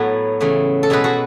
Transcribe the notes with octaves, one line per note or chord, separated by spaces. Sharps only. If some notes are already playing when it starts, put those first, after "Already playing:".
Already playing: A2 F#3 B3 E4 F#4 A4
C#3 E3 A3
A4
B2 G#3 B3 G#4 B4
F#4 A4